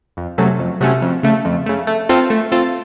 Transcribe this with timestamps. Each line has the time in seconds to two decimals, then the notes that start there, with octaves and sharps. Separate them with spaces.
0.17 F2
0.38 C3 F#3 A3 C#4
0.59 F2
0.81 C3 F#3 A3 C#4
1.02 F2
1.23 C#3 A3
1.45 F2
1.66 C#3 A3
1.87 A3
2.09 C4 F4 A4
2.30 A3
2.52 C4 F4 A4